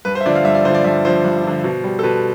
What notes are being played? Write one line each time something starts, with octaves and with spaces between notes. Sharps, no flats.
G2 B4
C5
E5
D3 F3 D5
F5
G2 E5
D5
D3 F3 C5
D5
G2 E5
D3 F3 C5
G2
D3 F3
B2
G3
A4
B2 B4